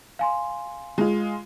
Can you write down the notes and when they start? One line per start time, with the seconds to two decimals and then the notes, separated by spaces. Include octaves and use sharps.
0.19 F5 G#5 C6
0.98 G#3 F4